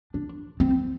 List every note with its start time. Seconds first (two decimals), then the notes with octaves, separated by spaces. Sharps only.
0.14 D4
0.60 C4